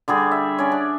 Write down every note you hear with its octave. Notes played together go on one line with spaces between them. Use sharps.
D3 G3 G#4
E5
C#4 D5
D4